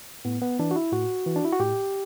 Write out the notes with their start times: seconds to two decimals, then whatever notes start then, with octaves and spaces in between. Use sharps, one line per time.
0.25 A2 B3
0.42 B3
0.59 E3 D4
0.71 F#4
0.76 E4
0.92 A2 F#4
1.26 E3
1.36 D4
1.45 E4
1.52 F#4
1.60 A2 G4